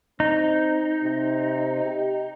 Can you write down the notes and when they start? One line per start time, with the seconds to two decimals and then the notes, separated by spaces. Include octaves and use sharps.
0.20 C4 D#4
1.03 C3
1.84 G4